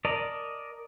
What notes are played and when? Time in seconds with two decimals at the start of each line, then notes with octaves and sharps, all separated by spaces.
0.05 A#4 D5 D#5 A5 A#5